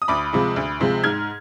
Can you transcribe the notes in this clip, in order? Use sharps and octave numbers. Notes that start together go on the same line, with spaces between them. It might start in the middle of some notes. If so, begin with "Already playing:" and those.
D#6
D2 B5 D6
C3 F3 G#3
D2
C3 F3 G#3
G#2 F6 G#6